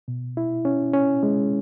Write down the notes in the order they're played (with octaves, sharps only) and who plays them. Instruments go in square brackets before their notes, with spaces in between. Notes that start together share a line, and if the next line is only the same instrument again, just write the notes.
[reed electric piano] B2
E4
C#4
C#4
G#3